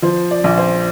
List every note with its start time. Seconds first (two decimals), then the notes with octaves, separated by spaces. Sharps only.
0.02 F3 C5
0.31 D5
0.44 A#1
0.58 C5